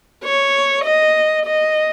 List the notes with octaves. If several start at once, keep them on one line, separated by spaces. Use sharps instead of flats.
C#5
D#5
D#5